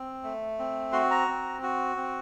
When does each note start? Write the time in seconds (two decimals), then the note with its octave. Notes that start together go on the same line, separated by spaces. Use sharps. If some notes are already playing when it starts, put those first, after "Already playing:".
Already playing: C4
0.23 A3
0.59 C4
0.93 F#4 C6
1.10 A#5
1.28 C4
1.62 F#4
1.96 C4